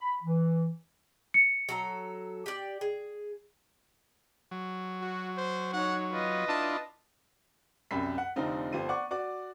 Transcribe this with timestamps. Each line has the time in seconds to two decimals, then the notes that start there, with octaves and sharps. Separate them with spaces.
0.01 B5
0.23 E3
1.34 C#7
1.69 F#3 A4 A#5
2.46 G4 D5
2.81 G#4
4.51 F#3
5.02 F#4
5.37 C5
5.73 D#4 C#5 F#5
6.12 F4 B4 D#5
6.48 D4 E4 F4 A5
7.91 C2 F#2 G4 B5 B6
8.18 F#5
8.36 F1 D3 F3 C4 D#4 F4
8.73 G1 F3 G4 C5 D#7
8.89 D5 F#5 C#6 D6
9.11 F#4 D5 D6